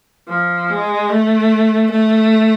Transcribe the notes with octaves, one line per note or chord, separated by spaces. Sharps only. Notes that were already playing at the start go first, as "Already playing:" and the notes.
F3
G#3
A3
A3